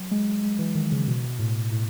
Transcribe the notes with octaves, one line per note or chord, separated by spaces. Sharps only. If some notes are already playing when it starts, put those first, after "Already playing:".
Already playing: F#3
G#3
G#3
E3
D#3
C#3
B2
A2
A2